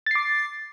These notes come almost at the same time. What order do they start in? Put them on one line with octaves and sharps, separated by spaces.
A6 C7 D6